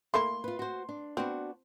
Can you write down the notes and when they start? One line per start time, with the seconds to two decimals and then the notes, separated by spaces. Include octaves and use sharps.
0.14 A3 A#3 E4 C6
0.44 F4 B4
0.59 F#4 C5
0.89 D4
1.17 B3 C4 D4 F#4